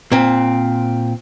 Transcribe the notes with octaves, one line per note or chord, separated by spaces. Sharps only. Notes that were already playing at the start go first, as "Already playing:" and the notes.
A#2 C4